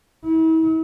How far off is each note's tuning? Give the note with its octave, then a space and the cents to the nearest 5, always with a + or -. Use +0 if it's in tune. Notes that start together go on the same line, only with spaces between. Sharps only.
E4 -40